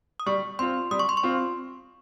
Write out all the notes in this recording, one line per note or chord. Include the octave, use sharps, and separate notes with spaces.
D#6
G3 C#6
C4 F4 C6
G3 D#6
C#6
C6
C#6
C4 F4